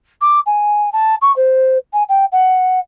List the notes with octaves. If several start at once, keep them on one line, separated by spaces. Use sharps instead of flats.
D6
G#5
A5
C#6
C5
G#5
G5
F#5